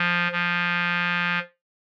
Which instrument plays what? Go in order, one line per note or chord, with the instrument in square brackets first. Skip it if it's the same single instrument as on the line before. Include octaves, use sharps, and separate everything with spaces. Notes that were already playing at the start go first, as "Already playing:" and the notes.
Already playing: [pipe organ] F3
F3